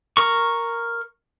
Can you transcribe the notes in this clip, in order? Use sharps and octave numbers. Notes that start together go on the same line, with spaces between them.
A#4 C#6